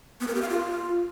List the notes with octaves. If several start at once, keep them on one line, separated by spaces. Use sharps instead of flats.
B3
A#4
G4
F5
F4